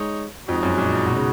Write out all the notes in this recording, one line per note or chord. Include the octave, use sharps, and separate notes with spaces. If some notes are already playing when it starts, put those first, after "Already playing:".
Already playing: G#3 D#4 C#5
F2 G#3 D#4 F#4
F#2
A#2
B2
C#3